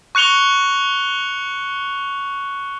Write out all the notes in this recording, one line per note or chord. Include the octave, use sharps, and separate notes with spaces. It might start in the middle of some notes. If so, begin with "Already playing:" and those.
C#6 F#6 C#7 F7 G7